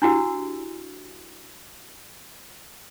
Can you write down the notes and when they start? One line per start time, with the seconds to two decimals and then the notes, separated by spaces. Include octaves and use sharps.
0.02 D4 E4 F#4 G4 F#5 E6